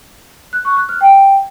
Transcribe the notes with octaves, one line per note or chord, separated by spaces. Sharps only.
F#6
C#6
F#6
F6
G5